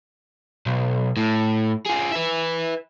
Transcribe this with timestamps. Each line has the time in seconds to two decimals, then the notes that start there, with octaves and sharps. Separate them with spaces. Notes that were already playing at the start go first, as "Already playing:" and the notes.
0.66 B1
1.17 A2
1.86 F4 G#4
2.12 B4 E5